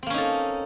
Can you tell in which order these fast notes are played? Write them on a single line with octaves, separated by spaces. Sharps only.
C4 A#3 C#4 D#4 A4